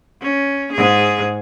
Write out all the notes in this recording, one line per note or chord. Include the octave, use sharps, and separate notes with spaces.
C#4
G#2 G#4